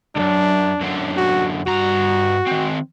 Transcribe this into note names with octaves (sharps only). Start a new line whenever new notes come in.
C#2 F#2 D4
F#2 D3
F#4
G2 F#4 A#5
D#3 C4